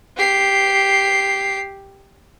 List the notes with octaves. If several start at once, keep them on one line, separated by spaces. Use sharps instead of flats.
G4 C7